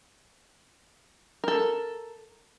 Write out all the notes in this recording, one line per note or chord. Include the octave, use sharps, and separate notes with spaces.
A4 A#4